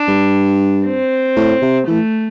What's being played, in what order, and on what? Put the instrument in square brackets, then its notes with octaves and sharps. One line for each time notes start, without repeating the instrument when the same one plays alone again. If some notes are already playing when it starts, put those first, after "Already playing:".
Already playing: [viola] D4
[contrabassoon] G2
[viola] C4
[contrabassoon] A2
C3
[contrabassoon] E3 [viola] A3